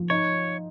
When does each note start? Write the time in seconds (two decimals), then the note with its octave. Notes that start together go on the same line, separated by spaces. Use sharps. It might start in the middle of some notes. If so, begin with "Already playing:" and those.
Already playing: F3
0.10 D#4 C#5